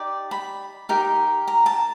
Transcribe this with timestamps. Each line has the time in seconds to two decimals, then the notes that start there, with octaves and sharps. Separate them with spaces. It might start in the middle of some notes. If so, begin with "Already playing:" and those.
Already playing: D#4 G4 D5
0.31 B5
0.89 D#4 G4 A#4
1.47 A#5
1.66 A5